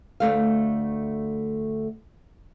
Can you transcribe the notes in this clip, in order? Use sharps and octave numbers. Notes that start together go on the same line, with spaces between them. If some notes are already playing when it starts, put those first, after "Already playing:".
D2 G#2 A3 F5